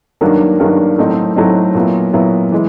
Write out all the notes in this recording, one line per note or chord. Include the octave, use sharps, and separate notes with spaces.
G2 D#3 F#3 A#3 D4
G2 D#3 F#3 A#3 D4
A2 F#3 A3 C4 D#4
A2 F#3 A3 C4 D#4
A#2 F#3 B3 E4
A#2 F#3 B3 E4
E3 G#3